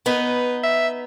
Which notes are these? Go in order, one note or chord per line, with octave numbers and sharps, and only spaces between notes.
B3 D#4 B4
E5